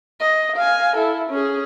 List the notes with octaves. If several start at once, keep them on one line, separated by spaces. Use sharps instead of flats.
D#5
F5 G#5
E4 A4
C#4 G#4